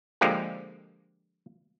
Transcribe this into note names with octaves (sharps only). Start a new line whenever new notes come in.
D3 F3 G#3 A#3 G4